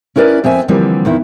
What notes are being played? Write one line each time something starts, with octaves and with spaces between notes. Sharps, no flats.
C#4 E4 A#4 B4 D5
F2 C4 E5 G#5
D3 E3 F3 G3 A#3 C4
E2 D#3 E4